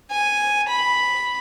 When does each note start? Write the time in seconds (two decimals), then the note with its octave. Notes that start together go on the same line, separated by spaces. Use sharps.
0.11 G#5
0.69 B5